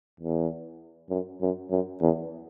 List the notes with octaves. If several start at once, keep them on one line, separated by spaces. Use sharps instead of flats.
E2
F#2
F#2
F#2
E2